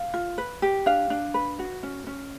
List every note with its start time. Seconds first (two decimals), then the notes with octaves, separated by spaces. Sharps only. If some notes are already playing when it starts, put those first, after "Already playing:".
Already playing: F5
0.14 F4
0.38 B4
0.62 G4
0.86 D4 F5
1.10 D4
1.34 B4
1.59 F#4
1.83 C#4
2.07 C#4